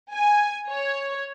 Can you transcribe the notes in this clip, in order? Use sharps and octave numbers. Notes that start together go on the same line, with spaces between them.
G#5
C#5